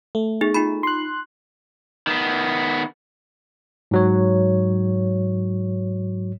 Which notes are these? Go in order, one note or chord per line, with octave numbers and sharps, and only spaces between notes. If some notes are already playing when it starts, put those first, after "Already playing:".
A3
B3 D#4 G#4
D#4 F4 B5
C6 F#6
D#3 B3
G#2 F#3 C#5